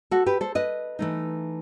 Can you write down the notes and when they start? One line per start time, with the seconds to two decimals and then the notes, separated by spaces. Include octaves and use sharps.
0.11 F#4 A4
0.26 G4 B4
0.41 A4 C5
0.55 B4 D#5
0.99 E3 A3 D#4